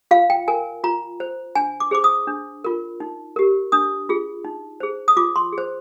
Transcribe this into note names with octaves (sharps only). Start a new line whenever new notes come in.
F4 F5
G5
A#4 G#5
F4 A#5
C5
D4 G#5
D6
G#4 C5 D6
D#6
D4
F4 A#4
D#4
G4 A#4
D4 D#6
F4 G#4
D#4
G#4 C5
D#6
F4 D6
C6
G#4
C5